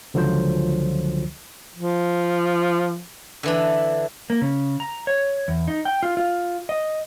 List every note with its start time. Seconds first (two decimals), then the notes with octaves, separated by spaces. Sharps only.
0.14 C#2 D3 F3 F#3 F4 C5
1.76 F3
3.43 D3 E3 D4
4.30 A#3
4.42 C#3
4.80 A#5
5.07 C#5
5.48 E2
5.68 D#4
5.85 G5
6.03 F4
6.17 F4
6.69 D#5